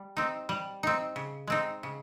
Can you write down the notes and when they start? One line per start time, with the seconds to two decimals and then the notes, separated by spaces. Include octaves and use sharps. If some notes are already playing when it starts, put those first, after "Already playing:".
Already playing: G3
0.17 C4 D#4
0.49 G3
0.83 C4 D#4
1.16 C#3
1.47 G#3 C4 D#4
1.83 C#3